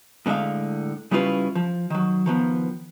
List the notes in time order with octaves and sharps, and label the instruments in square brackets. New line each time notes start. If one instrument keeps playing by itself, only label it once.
[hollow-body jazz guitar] A2 D3 G#3 E5 F5
C#3 G3 C#4 E4 F4 B4
F3
D#3 F#3
D#3 F3 B3